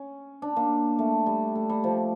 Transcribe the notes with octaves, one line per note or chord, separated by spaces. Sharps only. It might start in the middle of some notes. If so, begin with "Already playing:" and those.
Already playing: C#4
D4
A#3
A3
G3
A3
G3
F3